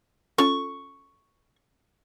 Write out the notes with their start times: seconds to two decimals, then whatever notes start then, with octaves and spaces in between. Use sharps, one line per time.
0.38 C#4 F4 A4 C#6